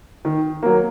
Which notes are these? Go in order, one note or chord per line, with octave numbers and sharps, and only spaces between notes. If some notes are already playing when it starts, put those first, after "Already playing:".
D#3
F#3 A#3